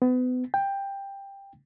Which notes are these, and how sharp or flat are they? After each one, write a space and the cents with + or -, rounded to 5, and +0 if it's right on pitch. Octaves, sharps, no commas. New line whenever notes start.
B3 +35
G5 +15